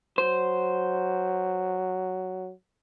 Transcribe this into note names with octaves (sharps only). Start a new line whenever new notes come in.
F#3 C5